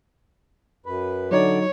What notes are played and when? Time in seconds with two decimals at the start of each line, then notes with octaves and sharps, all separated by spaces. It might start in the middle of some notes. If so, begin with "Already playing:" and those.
0.86 F#2 B4
1.31 D3 F#3 D#4 C#5 D5